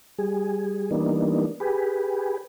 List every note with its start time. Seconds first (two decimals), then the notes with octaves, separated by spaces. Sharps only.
0.18 G3 G#4
0.91 E3 G3 A#3 B3 D4 D#4
1.60 G4 G#4 B4